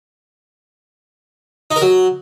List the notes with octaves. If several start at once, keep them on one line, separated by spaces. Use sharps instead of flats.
D#4
A#4
F#3